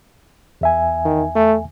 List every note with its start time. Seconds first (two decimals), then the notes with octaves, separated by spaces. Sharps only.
0.61 E2 E5 G#5
1.05 D#3
1.35 A3